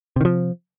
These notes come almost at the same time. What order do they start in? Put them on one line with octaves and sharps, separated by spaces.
C3 D#3 F3